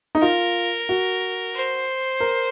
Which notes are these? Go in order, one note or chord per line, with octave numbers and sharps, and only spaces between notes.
D#4
F4 A#4
F#4
C5
A#4